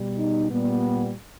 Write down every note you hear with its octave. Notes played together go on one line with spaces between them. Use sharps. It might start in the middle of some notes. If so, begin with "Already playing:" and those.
Already playing: B2 G3
D#4
A#2 G3 B3